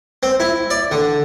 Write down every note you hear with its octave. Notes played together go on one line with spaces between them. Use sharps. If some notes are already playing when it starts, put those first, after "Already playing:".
C4
E4
D5
D3